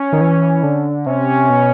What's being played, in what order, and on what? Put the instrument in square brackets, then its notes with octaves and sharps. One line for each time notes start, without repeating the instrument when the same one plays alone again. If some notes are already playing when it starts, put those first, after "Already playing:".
Already playing: [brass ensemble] C#4
[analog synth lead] D#3
E3
D3
[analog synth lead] C3 [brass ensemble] C#4
[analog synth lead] B2